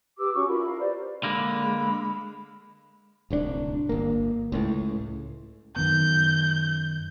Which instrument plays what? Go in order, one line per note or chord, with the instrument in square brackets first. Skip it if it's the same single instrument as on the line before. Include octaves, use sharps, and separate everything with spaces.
[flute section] G4 B4 D6 E6
C#4 F#4 C#5 C#6
E4 F4 A#4 B5
A#4 F5
G4 B4 C5 D5
[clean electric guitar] D3 A#3 [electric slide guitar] G#3 [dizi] B5
[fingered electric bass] D1 C2 C4 D4
G1 A#3
C#2 A2
[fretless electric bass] F#2 D#3 B3 [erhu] G6